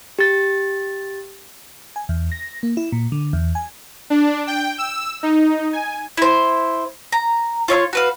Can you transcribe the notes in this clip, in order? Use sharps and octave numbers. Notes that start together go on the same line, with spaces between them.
G4 A6
G#5
E2
A#6
A#3
E4
A#2
D3
E2
G#5
D4
G5
E6
D#4
G#5
E4 C5
A#5
F4 C#5 E5 C6
F#4 B4 F5